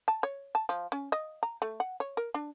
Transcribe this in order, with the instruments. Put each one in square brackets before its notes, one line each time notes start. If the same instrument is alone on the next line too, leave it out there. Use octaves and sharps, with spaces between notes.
[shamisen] A5
C#5
A5
F3
C#4
D#5
A#5
A3
F#5
C#5
A#4
D4